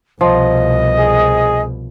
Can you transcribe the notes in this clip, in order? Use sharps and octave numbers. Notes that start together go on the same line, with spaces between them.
C2 B2 F3 D#5
G#4